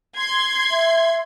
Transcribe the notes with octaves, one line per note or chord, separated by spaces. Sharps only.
C6 G#6
E5